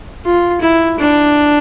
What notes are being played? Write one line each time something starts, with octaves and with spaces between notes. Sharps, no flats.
F4
E4
D4